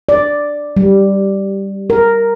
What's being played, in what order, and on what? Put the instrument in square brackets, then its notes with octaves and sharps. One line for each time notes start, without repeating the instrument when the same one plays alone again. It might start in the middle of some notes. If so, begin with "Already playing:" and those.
[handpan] D5
G3
A#4